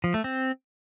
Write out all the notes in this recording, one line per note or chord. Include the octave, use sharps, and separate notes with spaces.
F3
A3
C4